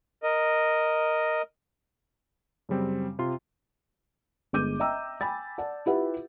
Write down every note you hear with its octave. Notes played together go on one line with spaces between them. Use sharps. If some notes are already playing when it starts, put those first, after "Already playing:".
A#4 D#5
F#2 C#3 G3 C4
C3 F4 C6
G1 G#3 D6 G6 D#7
D#5 E5 G5 A#5 E6
G5 G#5 B5 A6
D5 F#5 A5
E4 F4 G4 B4 E5 F#5